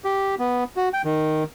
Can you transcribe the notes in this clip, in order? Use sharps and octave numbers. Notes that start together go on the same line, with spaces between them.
G4
B3
F#4
G5
D#3